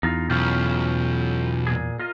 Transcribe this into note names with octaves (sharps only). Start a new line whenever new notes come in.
E2 D#4 F4
B1 C#4 F4 G4
A#2 G#4
F4 A#4 D#5